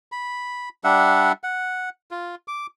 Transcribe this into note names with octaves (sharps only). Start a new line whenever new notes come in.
B5
G3 D4 E5 F#5
F#5
F4
D6